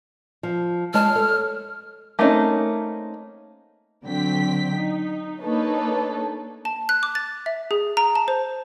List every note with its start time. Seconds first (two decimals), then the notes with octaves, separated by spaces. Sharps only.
0.43 F3
0.94 G#3 C#5 A5 F6
1.15 A4 C#5
2.19 A3 A#3 C4 C#4 D#4
4.04 D3 F#3 C4 G5 B6
4.76 D#4
5.41 A#3 D4 D#4 A4 B4 C#5
6.65 A5
6.89 F#6
7.03 D6
7.15 A6
7.46 E5
7.71 G#4
7.97 A#5
8.15 A5
8.28 C5